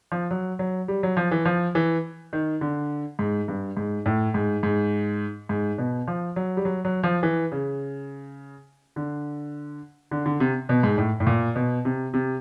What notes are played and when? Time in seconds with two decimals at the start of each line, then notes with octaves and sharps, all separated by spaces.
0.12 F3
0.31 F#3
0.59 F#3
0.88 G3
1.03 F#3
1.17 F3
1.31 E3
1.45 F3
1.75 E3
2.33 D#3
2.61 D3
3.19 G#2
3.48 G2
3.77 G#2
4.06 A2
4.34 G#2
4.63 G#2
5.49 G#2
5.78 B2
6.08 F3
6.36 F#3
6.57 G3
6.65 F#3
6.85 F#3
7.04 F3
7.23 E3
7.52 C#3
8.96 D3
10.11 D3
10.26 D3
10.40 C3
10.69 B2
10.83 G#2
10.98 A2
11.20 A2
11.27 A#2
11.56 B2
11.85 C3
12.14 C3